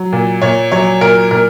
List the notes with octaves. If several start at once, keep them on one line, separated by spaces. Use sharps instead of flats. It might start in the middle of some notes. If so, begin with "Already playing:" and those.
Already playing: F#3
A#2
A#2 C#5
F#3 C#5
A#2 A#4
A#2 A#4